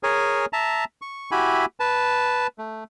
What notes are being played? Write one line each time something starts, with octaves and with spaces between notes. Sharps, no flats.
G#4 A#4 C#5 G#5
E5 A5 A#5
C#6
E4 F#4 G4 E5 G#5 B5
B4 A5
A3